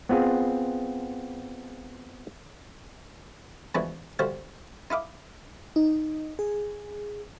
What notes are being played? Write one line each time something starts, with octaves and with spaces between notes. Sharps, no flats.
B3 C4 F4 G#4
E3 F3 G#3 B3 D4 F#4
D2 G3 F#4 C5 F5
D#4 E4 F5 D6
D#4
G#4